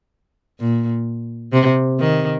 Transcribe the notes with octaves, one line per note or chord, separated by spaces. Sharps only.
A#2
C3
D#3